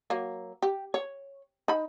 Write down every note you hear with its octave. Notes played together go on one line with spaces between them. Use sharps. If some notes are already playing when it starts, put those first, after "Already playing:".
F#3 A#3
G4
C#5
D#4 B5